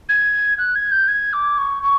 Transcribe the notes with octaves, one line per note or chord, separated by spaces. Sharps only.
G#6
F#6
G#6
G6
G#6
D6
C#6
C#6